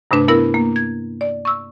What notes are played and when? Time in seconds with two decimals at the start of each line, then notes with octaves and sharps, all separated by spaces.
0.11 G2 C3 A3 D4 B4
0.28 B3 E4 A#4 E6
0.54 A#3
0.76 G#6
1.21 D5
1.45 C#6 E6